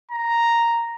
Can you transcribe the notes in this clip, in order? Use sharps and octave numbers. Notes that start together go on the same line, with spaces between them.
A#5